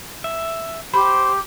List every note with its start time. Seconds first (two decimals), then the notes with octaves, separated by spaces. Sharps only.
0.24 E5
0.94 G4 C5 B5